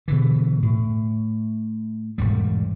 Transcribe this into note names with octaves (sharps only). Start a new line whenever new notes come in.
B2 D3 E3
A2
E1 G#2 G3